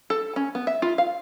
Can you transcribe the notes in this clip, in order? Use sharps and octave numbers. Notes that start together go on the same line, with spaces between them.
A4
C#4
B3
E5
F4
F5